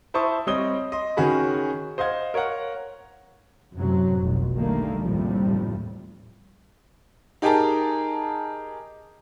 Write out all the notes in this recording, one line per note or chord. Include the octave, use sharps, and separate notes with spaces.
E4 C5 A5 C#6 D#6
G3 C4 C#5 D#5 D#6 G7
D#5 C6
D#3 C#4 F#4 G#4 B5
C5 D#5 F5 F#5 G#6
A#4 C#5 F5 F#5
F#2 A2 C3 F#3
F1 B1 G#2
D3 D#3 G3 A3 A#3
F#1 D#2 A2 C3 F3 G3
D#4 G4 G#4 A#4 A5 A#5